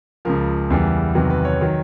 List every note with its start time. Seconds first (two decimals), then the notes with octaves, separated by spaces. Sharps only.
0.25 C#2 C#3 F3 A#4
0.70 E2 C#3 E3 G3
1.15 E2 C3 D#3 F#3 B4
1.30 B4
1.45 C#5
1.61 D#3 F#3